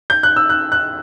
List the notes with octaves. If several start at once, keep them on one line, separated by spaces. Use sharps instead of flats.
G6
F#6
E6
F#6
F#6